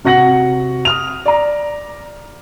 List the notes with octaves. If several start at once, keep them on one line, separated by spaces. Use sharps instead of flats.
C3 F#4 F#5 A#6 C#7 F#7
D#6 F6 F7
D5 A#5